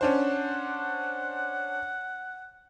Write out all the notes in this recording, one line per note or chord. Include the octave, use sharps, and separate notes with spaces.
C#4 D4 C5 F#5